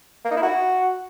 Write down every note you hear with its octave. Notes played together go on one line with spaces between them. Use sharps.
A#3
D#4
E4
F#4